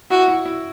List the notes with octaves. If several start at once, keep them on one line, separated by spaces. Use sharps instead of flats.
E4 F#4
F#4
E4
E4